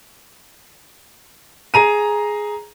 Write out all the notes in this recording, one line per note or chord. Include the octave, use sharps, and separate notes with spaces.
G#4 A#5 D#7